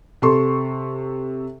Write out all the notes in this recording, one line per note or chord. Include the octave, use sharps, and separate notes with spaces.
C3 A4 C6 C#6